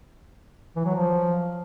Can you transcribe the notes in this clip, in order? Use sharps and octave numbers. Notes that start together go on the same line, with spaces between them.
E3
F#3
F3